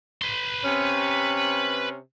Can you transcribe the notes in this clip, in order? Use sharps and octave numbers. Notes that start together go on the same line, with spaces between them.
B4 C6
C3 C#4